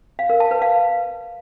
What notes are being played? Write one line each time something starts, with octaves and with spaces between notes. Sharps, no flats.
F5
A#4
A5
B4
F5